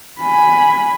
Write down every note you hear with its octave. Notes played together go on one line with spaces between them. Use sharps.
G#5 B5